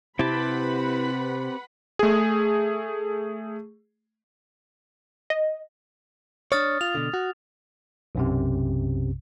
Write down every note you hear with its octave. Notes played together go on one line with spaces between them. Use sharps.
C3 C4 E4 G4 B4 F#5 A5 B5
A3 G#4
D#5
D4 C#5 D#6 F6 A6
F4 F7
B2 D3
F#4
B1 F#2 C3